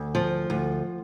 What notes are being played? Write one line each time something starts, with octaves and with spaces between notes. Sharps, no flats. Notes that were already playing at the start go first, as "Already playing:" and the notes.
Already playing: D2
F3
D2